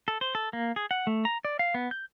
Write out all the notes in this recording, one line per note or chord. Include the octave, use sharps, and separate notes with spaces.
A4
C5
A4
A#3
G#4
F#5
A3
A#5
D5
F5
B3
G6